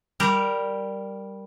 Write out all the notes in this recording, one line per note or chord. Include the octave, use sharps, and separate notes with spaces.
G3 G4 A#4